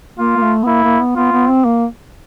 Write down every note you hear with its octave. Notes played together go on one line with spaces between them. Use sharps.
A#3 F4
A#3
A3
B3
A#3 E4
A#3
B3
B3 F4
B3
C4
A#3